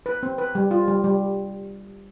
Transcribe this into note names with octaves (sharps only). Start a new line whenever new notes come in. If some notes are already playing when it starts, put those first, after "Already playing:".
B4
C4
B4
G3
F4
G3
G3